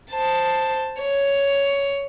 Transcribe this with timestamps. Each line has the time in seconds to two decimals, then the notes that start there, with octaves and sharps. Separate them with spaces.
0.12 C5 A5
1.01 C#5